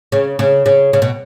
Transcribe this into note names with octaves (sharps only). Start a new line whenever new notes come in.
C#3
C#3
C#3
C#3
B2